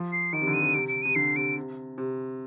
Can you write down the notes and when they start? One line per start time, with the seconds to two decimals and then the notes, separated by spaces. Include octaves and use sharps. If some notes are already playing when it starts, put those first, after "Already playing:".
Already playing: F3
0.12 C7
0.33 D#3 D7
0.41 C3
0.47 D3
0.54 D#7
0.61 C3
0.74 C3 D7
0.88 D7
1.02 C3 D#7
1.15 D3 C7
1.36 C3 D7
1.57 C3
1.98 C3